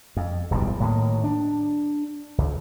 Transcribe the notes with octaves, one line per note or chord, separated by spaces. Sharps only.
F2
D1 B1 F2 G3
A2 D#3 A#3
D4
C#2